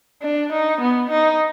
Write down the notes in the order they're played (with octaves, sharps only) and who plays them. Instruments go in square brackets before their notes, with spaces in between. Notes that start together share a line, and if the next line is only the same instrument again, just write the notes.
[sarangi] D4
D#4
B3
D#4